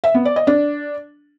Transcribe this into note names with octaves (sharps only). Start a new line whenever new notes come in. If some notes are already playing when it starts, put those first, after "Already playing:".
E5
B3
D5
D#5
D4